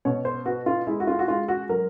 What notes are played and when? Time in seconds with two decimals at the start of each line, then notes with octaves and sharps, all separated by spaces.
0.05 B2 C#5
0.25 C5
0.45 B3 F#4
0.66 F4
0.87 G#3 E4
1.00 F#4
1.07 F4
1.19 F#4
1.28 G#3 F4
1.48 F#4
1.69 F#3 A#4